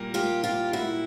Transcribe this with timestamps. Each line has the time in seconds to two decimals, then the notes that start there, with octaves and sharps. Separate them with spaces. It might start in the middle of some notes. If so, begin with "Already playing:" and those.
Already playing: A#2 G3 A#3
0.14 F4 G4
0.44 F4 G4
0.73 E4 F#4